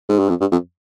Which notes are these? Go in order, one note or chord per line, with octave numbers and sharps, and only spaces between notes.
G#2
G2
F2
G2
F2